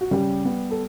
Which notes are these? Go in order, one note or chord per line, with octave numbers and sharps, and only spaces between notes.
F#4
C#3 G3 G4
B3
A4